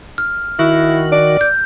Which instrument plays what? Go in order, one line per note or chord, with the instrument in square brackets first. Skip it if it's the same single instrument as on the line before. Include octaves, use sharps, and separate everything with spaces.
[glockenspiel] F6
[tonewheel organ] D#3 F#4 [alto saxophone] E4
[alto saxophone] D5
[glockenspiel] G6